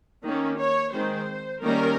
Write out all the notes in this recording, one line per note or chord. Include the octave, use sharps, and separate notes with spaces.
D#3 A#3 C#4
C#5
D#3 G#3 C4 C5
D#3 G3 A#3 C#4 A#4